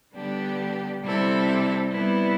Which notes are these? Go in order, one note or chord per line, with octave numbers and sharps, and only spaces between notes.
D3 G3 B3 D4 G4
C3 G3 C4 E4 A4
C3 G3 B3 E4 B4